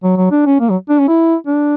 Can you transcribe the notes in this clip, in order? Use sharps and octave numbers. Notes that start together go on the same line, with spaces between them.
F#3
F#3
D4
C#4
A#3
F#3
D4
C#4
E4
D4